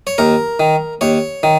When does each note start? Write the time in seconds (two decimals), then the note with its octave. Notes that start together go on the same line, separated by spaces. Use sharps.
0.07 C#5
0.18 D#2 A#4
0.60 D#3
1.01 D#2 C#5
1.43 D#3